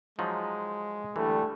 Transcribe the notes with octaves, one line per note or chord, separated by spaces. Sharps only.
F3 F#3 G#3 D#4
D3 E3 G3 A3